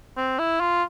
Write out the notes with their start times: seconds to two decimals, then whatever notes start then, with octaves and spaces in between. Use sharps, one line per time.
0.17 C4
0.39 E4
0.60 F4